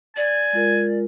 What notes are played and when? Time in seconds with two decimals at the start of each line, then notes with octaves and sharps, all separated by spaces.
0.17 D5 G#5
0.53 G#3 F4 A#4